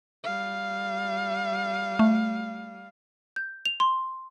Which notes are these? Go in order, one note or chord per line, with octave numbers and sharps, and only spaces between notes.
G3 F5
A3
G6
F7
C6